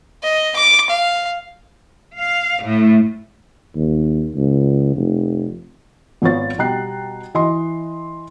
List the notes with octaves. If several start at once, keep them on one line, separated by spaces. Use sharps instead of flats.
D#5
D6
F5
F5
A2
D#2
C#2
F1
G#1 F3 B3 C#5 A6
B2 G3 G5 A#5 F#6 C7
E3 D#5 C6